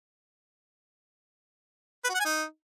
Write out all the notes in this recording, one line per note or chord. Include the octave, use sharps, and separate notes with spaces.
B4
F#4
F#5
G#5
D#4